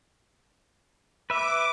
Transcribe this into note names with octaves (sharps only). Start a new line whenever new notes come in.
B4 E5 D6